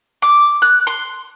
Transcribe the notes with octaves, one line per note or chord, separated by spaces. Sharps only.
D6
F#6
C6